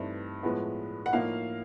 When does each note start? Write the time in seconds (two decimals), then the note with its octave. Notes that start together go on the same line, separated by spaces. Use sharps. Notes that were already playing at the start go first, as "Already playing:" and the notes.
Already playing: G2 E3 A3 C4 D#4
0.43 A2 F3 G#3 B3
1.06 F#5
1.13 A2 F3 A#3 D#4 F5